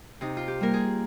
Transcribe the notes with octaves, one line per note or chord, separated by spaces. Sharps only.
C3 D#4
F4
G4
G3 A#3 A#4
G#4